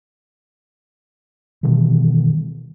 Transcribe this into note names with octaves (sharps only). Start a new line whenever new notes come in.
B2 D#3 E3 G3